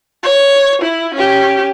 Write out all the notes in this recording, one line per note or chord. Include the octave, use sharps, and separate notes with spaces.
C#5
E4
C#4 G4